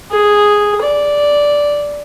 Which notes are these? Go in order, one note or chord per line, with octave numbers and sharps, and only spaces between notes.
G#4
D5